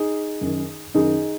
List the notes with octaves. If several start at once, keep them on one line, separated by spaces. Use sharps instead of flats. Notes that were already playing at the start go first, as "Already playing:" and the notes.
Already playing: D#4 G#4
F#2 D#3
F#2 D#3 D#4 G#4